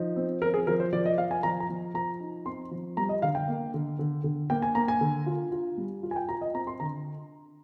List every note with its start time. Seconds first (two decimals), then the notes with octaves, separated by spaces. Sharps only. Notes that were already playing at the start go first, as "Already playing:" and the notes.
Already playing: F3 D#4
0.16 C4
0.42 F3 A#4
0.54 G#4
0.67 F3 A#4
0.80 C5
0.93 F3 D5
1.06 D#5
1.18 F3 F5
1.31 G#5
1.43 F3 A#5
1.60 A#5
1.69 F3
1.94 F3 A#5
2.20 D#4
2.46 C4 C6
2.71 F3
2.97 G3 A#5
3.09 D#5
3.22 D3 F5
3.35 G5
3.48 A#3
3.74 D3
3.99 D3
4.24 D3
4.50 A#3 G5
4.62 G#5
4.75 A#3 A#5
4.88 G#5
5.01 D3
5.26 F4
5.51 F4
5.78 G3
6.03 F4
6.11 G#5
6.16 G5
6.29 F4 A#5
6.41 D#5
6.54 C4 A#5
6.67 C6
6.80 D3 A#5